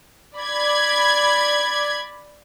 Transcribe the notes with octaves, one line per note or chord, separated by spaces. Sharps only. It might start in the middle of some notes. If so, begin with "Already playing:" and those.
D5 B5 G#6